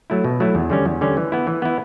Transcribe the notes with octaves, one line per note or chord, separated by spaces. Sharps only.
F#3 A3 E4
B2
F#3 A3 E4
E2
D3 G3 C#4
E2
D3 G3 C#4
E3
B3 E4
E3
B3 E4